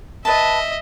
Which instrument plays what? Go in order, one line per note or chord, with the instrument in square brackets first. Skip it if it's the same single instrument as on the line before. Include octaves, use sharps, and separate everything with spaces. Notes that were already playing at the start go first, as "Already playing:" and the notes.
[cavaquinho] B4 A5 [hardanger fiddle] D#5 E5